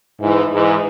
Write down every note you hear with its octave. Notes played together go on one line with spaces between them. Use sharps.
G#2 E3
G#2 E3